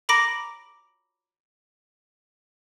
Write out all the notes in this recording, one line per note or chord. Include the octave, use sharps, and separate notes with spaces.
A#5 B5 D6 A#6 D7